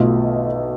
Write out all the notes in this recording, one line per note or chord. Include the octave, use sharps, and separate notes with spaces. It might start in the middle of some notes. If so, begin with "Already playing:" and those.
Already playing: B1 B2 A3 F4